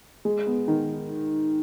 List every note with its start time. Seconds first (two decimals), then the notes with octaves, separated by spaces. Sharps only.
0.25 G#3
0.47 B3
0.68 D#3